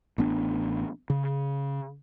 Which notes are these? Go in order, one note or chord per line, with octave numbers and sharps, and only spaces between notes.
A1 B3 D4
C#3